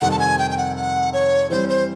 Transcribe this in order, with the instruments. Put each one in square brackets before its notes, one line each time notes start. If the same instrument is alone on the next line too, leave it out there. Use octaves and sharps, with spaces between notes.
[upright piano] F2 C3 D#3 G3 C4 [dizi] F#5
[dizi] A5
G#5
G5
G5
F#5
F#5
C#5
[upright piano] E3 G3 C4 [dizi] C5
[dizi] C5